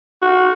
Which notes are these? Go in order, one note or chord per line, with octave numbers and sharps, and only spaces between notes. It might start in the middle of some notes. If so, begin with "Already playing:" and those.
F#4